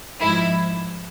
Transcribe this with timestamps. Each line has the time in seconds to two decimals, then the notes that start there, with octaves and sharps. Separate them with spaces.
0.21 G#2 F3 E4